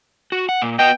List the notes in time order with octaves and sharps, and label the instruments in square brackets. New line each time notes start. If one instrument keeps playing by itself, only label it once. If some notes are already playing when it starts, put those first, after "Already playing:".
[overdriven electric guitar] F#4
F#5
A#2
[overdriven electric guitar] B3 D#5 [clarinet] G5